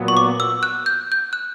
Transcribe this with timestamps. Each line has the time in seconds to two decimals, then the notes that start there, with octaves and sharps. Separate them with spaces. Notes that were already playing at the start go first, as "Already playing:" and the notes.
Already playing: A#2 F#3 B3
0.08 C#6
0.17 D6
0.40 E6
0.63 F#6
0.86 G6
1.12 G6
1.33 F#6